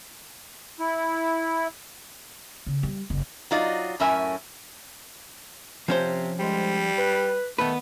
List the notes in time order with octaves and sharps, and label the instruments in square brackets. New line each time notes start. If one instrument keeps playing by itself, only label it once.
[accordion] E4
[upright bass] C#3
G3
F#1
[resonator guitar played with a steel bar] F#3 D#4 F4 D5 D#5
F#2 A2 C#4 A#4 E5 G#5
[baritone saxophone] C3 [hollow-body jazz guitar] F3 C#4 C5
[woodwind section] G#2 D3 G#3 [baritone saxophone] G3
[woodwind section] B4
[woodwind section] D#3 [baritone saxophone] A3 [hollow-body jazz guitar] B3 B4